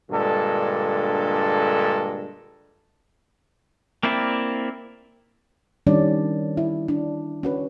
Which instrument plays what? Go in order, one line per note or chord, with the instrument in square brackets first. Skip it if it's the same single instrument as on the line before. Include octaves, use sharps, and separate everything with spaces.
[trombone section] G2 A#2 D3 G#3 A4
[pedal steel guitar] A#3 C4 E4 D5 E5
[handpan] D#3 G3 C#4 D4 D5
E4
D4
C#4 F#4 B4